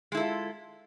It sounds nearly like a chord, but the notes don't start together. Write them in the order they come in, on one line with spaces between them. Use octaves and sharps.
G#3 E4 A4 F4